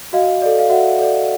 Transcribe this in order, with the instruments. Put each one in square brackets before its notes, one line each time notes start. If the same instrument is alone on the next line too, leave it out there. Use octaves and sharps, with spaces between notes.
[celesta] F#4 D#5 F5
A4 D5
F5
F#4 E5 F#5
A4 D5